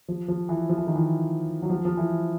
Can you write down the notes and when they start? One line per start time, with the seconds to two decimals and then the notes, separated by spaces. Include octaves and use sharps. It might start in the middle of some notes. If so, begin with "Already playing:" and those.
0.08 F3
0.28 F3
0.49 E3
0.69 F3
0.78 E3
0.87 D#3
0.96 E3
1.62 F#3
1.70 F3
1.85 F3
1.97 E3